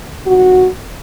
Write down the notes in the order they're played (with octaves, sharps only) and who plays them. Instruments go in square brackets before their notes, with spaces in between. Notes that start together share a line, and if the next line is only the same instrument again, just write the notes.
[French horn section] C3 D#3 G3 F#4